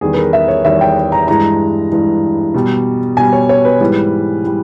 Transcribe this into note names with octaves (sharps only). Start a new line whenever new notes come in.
E2 D#3 G3 G#4
B4
A#4
E5
C#5
E2 D#3 G3 E5
G5
A#5
G2 E3 G#3 A#5
G2 E3 G#3
B2 G3
B2 G3 G#5
C#5
C#5
B4
G#2 E3 G3
E3 G3